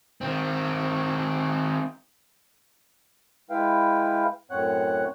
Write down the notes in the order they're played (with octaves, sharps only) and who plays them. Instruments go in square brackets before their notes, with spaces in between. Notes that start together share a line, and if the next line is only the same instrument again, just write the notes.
[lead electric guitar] D#3 C4
[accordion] G#3 E4 B4 F5 G5
F#2 A2 C4 C#5 F#5 F#6